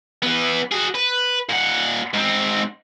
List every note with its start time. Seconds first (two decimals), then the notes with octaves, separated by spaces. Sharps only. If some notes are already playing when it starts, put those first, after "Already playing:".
0.23 E3 B3
0.71 F#4 G#4
0.95 B4
1.49 A#2 F#5
2.13 G#2 C4